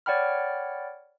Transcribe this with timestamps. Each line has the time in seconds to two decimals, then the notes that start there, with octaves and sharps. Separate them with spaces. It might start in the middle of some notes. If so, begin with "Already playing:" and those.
0.06 C#5 D5 F#5 G5 B5 F6